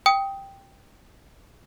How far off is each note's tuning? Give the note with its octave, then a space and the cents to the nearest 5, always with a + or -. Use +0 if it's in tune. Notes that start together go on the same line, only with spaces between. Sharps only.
G5 +0 D#6 +15